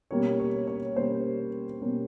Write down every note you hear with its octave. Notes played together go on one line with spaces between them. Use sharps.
B2 G3 A#3 C#4 C#5
C#5
C#5
B2 G3 A#3 C#4 C5
B2 G3 A#3 C#4